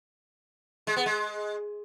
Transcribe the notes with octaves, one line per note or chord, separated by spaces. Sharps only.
G#3
B3
G#3